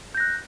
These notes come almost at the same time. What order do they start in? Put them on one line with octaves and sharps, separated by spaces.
G6 A#6 F#6